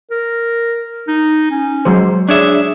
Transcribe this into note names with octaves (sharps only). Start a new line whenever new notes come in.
A#4
D#4
C#4
F#3 G#3 C5
D4 G#4 C#5 E5